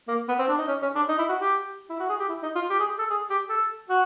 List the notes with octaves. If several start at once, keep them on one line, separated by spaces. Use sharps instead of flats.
A#3
B3
C4
D4
D#4
C#4
C#4
D4
D#4
E4
F#4
G4
E4
F#4
G#4
G4
E4
D#4
F4
G4
G#4
A4
G#4
G4
A4
F#4